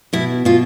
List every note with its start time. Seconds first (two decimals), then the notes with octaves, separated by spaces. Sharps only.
0.13 B2 E4
0.45 B2 F4